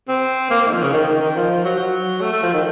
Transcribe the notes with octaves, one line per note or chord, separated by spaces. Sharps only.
C4
A#3
A#3
D#3
F3
C#3
D#3
D#3
D#3
F3
F3
F#3
F#3
A3
A3
F3
D#3